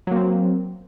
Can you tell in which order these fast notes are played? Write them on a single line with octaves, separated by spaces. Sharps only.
F#3 A#3 C4